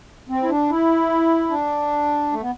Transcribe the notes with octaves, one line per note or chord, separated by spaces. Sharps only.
C4
E4
D4
E4
D4
A3
B3